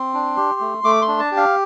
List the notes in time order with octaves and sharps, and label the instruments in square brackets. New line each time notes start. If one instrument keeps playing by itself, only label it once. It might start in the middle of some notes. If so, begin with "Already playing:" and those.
Already playing: [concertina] C4 C6
D4
G4
A3
A3 D6
C6
D4
A5
G4
F5